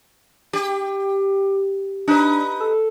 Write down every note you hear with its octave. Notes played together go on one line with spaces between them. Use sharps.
G4
D4 D#4 B4
A4